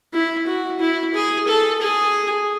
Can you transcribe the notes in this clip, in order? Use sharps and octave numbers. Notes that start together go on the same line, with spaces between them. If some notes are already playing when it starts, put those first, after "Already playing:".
E4
F#4
E4
G#4
A4
G#4